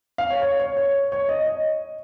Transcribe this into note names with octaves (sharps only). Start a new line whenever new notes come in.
F5
C#5
C#5
C#5
C#5
C#5
D#5
D#5